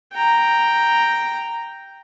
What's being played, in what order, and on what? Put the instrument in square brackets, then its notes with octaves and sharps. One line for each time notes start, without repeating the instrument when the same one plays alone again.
[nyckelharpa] G5 A#5